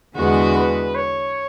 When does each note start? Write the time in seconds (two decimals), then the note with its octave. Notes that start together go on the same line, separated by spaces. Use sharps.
0.16 E2 D3 G#3 B3 F#4
0.56 B4
0.95 C#5